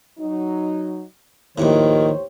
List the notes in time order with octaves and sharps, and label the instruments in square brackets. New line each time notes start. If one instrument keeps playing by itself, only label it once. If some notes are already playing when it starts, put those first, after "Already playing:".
[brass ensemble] F#3 D#4
[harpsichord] A#1 D#2 A2 [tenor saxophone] D#3 [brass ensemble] G4 C5 C#5